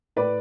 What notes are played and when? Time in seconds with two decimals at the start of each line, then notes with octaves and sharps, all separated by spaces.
0.16 A2 B4 D5